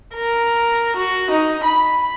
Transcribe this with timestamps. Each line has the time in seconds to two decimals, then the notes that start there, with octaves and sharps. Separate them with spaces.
0.14 A#4
0.96 F#4
1.31 D#4
1.64 B5